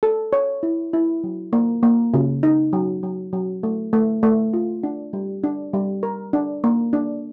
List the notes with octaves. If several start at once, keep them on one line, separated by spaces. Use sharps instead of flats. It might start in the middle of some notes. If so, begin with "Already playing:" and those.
A4
C#5
E4
E4
F#3
A#3
A#3
C#3
D#4
F#3
F#3
F#3
A3
A3
A3
F4
D4
G3
D4
G3
A#4
D4
A#3
D4